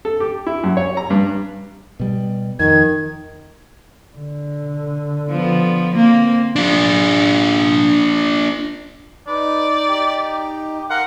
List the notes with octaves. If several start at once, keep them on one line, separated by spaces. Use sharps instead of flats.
A4
G4
E4
F#2
C#5
A#5
G2
B2 G3
F2 D#3 G#6
D3
F3 B3
A#3 C4
D4 F4
D#4 B4 D5
G4
A#4 F5 F#5 C6